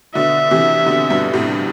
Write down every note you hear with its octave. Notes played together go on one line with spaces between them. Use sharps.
B2 D3 E5
C3 E3
B2 D3
G2 B2
A2 C3